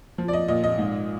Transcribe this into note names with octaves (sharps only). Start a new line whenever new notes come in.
F3
D5
D#5
A#2 D#5
D#5
G#2